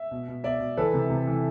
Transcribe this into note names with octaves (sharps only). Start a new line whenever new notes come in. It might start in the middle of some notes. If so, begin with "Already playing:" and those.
Already playing: E5
B2
B2
B2 D5 E5
B2
E3 A4 B4
C3
C3
E3